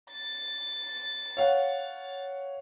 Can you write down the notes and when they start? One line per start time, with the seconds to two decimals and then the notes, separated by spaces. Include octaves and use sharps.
0.10 A6
1.37 C#5 F5 F#5